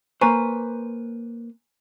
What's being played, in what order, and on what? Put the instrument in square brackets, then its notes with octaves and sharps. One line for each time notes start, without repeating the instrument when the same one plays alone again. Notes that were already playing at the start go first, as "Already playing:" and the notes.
[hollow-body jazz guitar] A#3 B4 C5 [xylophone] G#5 A#5 C#6